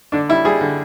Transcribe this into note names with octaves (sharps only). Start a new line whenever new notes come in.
D3 D4
G3 E4
G3 G#4
D3